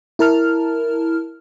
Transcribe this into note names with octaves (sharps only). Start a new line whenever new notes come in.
E4 A#4 A5 F6